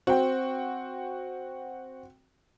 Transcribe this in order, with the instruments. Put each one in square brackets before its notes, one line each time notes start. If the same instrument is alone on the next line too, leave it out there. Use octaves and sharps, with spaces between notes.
[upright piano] C4 G5 [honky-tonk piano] F#4